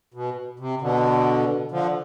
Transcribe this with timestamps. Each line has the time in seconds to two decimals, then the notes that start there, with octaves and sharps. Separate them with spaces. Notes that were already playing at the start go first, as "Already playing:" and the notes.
0.14 B2
0.59 C3
0.82 B2 D3
1.71 D3 F3